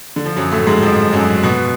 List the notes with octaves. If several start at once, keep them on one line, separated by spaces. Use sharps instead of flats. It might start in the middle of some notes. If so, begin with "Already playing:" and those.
D3
F3
F#2 F#3
A2 A3
G#2 G#3
F2 F3
F#2 F#3
B2 B3